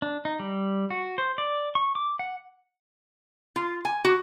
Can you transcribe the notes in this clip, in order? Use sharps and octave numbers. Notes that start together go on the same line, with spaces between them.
D4
D#4
G3
F#4
C5
D5
C#6
D6
F#5
F4
G#5
F#4